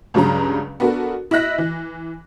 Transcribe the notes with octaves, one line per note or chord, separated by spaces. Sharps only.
C#2 G2 C#3 F#3 A#5
B3 D4 F#4 A4 A#4
E4 D#5 E5 F#6 A#6
E3